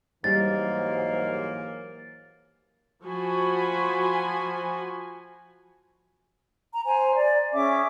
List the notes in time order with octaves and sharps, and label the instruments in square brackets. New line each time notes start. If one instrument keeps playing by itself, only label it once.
[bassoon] G#2 [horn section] E3 F#3 A#3 [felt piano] G3 [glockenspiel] A6
[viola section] F3 F#4 G#5 B5
[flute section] A#5
C5 G#5 A#5
D5
C#4 G#4 E5 D6